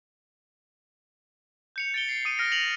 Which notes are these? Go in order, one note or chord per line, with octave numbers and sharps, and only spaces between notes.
G6 C#7 F7
A6 D7 G7
C7
D#6 D7 D#7
F6 A#6 D7
C#7 F7 F#7